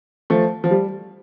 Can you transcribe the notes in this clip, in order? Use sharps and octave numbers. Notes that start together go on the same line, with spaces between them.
F3 A3
F3
G3